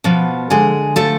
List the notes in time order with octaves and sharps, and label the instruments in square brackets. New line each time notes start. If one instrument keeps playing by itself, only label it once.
[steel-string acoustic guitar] B2 F3 B3
D3 G#3 G#4
F3 A3 A4